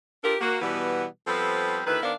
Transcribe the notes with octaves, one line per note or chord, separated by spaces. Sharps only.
D4 F4 G4 A4 A#4
A#3 F#4
B2 E3 G3 B3
F3 G3 B3 C4 A4
D2 D#3 E4 B4
D#3 B3 D4 A#4 C5 F5